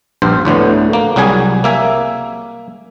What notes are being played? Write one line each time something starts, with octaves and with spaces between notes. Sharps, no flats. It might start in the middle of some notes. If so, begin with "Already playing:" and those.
A#1 G2 C5
D2 A2 D3 B3
A#3
C2 F#3 G3 G#4 G#5
A#3 E5 G#5